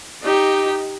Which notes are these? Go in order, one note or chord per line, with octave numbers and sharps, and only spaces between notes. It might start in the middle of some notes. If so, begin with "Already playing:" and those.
D#4 G4